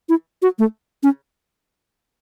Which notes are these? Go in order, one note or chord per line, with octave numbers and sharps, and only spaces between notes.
E4
F#4
A3
C#4